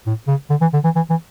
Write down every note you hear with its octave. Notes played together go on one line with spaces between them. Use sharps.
A2
C#3
D3
E3
D3
E3
E3
E3